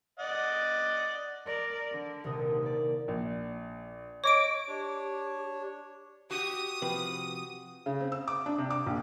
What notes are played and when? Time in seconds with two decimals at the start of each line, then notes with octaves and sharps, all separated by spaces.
0.19 D5 D#5 F#5
1.46 A#4 D5
1.91 D3
2.24 D#1 C3 D#6
2.62 A#3 D5
3.08 A#1
4.24 C#5 D#5 C#6 D6 D7
4.68 D4 G4 C#5
6.31 F#4 G4 D#6
6.82 C3 F3 B4
7.86 C#3
8.00 C4
8.12 E6
8.28 D6
8.46 D4
8.58 C3
8.70 D6
8.86 A#1